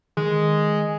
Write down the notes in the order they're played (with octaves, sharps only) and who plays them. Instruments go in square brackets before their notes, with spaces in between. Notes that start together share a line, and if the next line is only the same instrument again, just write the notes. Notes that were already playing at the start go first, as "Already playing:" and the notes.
[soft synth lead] D#3 [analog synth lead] G#3